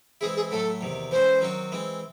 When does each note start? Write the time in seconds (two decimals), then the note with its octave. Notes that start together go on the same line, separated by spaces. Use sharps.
0.21 E3 G#3 C4 E4 G#4
0.36 G#4
0.51 A2 F#3 A3 A4
0.81 E2 C3 D#3
1.11 E3 G#3 C#4 F#4 C5
1.41 D#3 F#3 C4 F#4
1.72 E3 G#3 C4